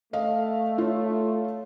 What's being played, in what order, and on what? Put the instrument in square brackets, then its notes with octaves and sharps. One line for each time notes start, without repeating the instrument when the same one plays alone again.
[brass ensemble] A3 [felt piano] D#5 F5
[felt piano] F4 C#5